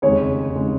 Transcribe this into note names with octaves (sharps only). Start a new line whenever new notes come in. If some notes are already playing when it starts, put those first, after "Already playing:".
F1 D#2 C#3 G#3 D#4 C#5
F1 C#3 G#3 D#4